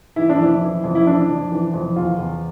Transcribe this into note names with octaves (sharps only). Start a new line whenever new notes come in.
E3 E4
D4
F2 E4
E3
F2
E4
E3 D4
F2
E3
F2
E2 F4
E2